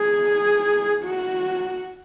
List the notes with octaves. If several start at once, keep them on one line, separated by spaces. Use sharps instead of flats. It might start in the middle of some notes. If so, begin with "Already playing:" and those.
Already playing: G#4
F#4